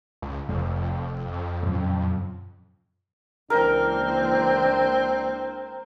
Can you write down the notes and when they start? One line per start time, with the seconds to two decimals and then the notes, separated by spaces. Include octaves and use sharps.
0.22 C#2
0.49 F1 F2
1.63 F#2 A#2 C#3
3.50 C#2 E3 A#3 C4 D4 A#4